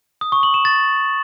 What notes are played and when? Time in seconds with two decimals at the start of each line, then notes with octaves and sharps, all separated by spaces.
0.21 D#6
0.32 C#6
0.43 F#7
0.54 E7
0.65 A6